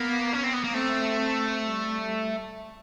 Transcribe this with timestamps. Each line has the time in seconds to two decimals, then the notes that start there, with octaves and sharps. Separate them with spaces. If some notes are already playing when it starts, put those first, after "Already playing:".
Already playing: A#3 B3
0.33 C#4
0.43 C4
0.53 B3
0.64 A#3
0.73 A3 C4
1.19 C4
1.63 G3